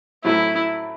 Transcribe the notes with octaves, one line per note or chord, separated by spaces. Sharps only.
A2 F#3 A3 C4 E4